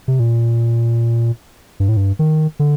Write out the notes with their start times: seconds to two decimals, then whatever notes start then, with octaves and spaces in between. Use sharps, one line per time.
0.08 C3
0.20 A#2
1.80 G2
1.89 A2
1.97 G2
2.19 D#3
2.59 D3